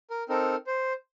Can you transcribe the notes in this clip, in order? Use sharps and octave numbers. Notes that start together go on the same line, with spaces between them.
A#4
C4 D#4 A4 A#4
C5